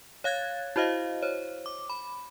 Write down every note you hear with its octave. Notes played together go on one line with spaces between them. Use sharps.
C#5 F5 F#6 G#6 A6
E4 F#4 C5 D#5 F5
C5 C#5
D6
B5